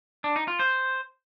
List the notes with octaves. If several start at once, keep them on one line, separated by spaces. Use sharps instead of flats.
D4
D#4
F4
C5